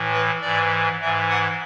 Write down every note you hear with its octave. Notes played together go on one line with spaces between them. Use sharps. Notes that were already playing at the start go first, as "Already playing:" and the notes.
Already playing: A2 E3
B4
G#2 E3 D5
G#2 E3 E5
F#5